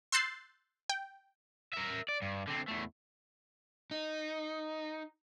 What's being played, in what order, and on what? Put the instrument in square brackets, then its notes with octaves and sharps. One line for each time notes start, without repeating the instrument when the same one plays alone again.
[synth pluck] C6 E6 F#6 G6 A6 C7
G5
[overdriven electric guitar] A#4 E5
D5
G2
D3 C4
E2 A3
[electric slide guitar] D#4